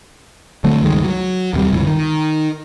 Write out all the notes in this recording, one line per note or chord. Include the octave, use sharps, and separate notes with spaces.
D3 F#3 A3 C4
C#2 G2 D#3 G#3
F#3
D#2 C3 G3
G1 C#2 E3
D#3